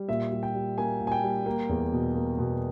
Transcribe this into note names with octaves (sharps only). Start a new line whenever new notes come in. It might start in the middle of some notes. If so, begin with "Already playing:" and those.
Already playing: G3
A#2 E5
G3
G5
G3
A#3 G#5
A#2
G#5
G5
G3
A#3
E2
B2
A#3
B2